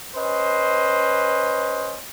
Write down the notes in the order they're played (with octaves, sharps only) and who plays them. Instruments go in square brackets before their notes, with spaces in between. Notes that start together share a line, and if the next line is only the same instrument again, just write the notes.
[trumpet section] C#4 B4 C5 D#5